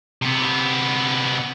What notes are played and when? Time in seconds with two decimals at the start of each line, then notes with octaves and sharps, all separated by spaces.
0.22 C3 B3